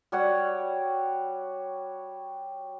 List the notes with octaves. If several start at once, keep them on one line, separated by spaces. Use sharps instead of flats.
G3 F#4 C#5 F#5